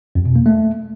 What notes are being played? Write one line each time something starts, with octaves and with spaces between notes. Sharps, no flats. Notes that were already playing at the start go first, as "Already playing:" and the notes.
F2
B2
A#3
A3